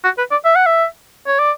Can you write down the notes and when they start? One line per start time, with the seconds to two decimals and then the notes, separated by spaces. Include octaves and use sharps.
0.04 F#4
0.18 B4
0.31 D5
0.45 E5
0.56 F#5
0.66 E5
1.27 C#5
1.39 D5